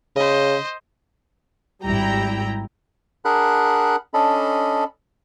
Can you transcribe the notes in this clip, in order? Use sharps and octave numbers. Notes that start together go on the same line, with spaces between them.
C#3 C5 D#5
G#1 G#2 G3 E4 G5 A#5
D4 G#4 A#4 F#5 B5 F#6
C#4 D4 A4 D#5 B5